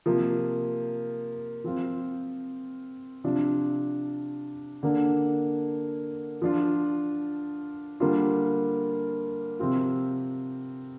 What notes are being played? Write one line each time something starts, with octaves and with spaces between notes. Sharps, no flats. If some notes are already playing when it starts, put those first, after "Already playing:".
C3 F3 A#3 F4
F3 C4 F4
C3 F3 D4 F4
D3 A#3 D4
F3 D4 F4
D3 G3 A#3 D4 F4
C3 F3 C4 F4